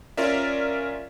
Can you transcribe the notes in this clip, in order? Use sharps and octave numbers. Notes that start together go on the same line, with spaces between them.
C#4 F4 A#4 D5 E5